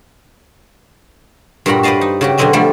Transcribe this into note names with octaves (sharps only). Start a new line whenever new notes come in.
G2 A#2 G3 F#4 A#5 B5
B4 C5 D5 D#5 F5 A5
D#4
C#3 F#4 G4
B2 D3 F#3 C4 D#5 E5
D3 F3 G3 A3